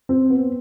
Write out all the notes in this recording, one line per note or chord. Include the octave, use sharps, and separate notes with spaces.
C4
B3